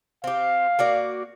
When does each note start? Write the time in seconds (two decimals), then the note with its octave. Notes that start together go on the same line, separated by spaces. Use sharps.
0.24 C4 G4 F5
0.79 A#3 F#4 D5